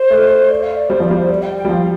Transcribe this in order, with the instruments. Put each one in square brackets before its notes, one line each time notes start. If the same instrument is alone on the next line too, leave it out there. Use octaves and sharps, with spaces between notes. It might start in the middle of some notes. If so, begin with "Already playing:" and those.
Already playing: [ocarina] C5
[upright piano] A3
[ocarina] D5
F5
D5
[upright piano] G3 [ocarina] C5
[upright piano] F3 [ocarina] D5
[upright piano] G3 [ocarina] F5
[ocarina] C5
D5
G5
G5
[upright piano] G3
[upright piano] F3 [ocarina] G5
[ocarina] F5